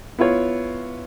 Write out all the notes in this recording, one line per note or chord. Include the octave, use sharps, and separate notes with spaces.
B3 E4 F4 C#5